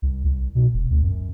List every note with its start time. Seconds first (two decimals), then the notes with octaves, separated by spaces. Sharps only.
0.02 C2
0.24 C2
0.55 B2
0.74 E1
0.90 D2
1.02 F#2